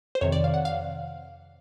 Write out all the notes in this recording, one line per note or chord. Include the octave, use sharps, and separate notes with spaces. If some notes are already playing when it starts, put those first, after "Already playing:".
C5
F2 C3 D#3 C#5
D5
F5
F#5
F5